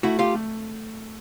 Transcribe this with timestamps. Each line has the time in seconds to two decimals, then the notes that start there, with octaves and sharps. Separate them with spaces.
0.03 A3 E4 F#4
0.19 F4 G4
0.35 A3